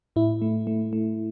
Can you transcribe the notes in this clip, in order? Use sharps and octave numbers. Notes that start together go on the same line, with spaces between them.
A2 E4
A3
A3
A3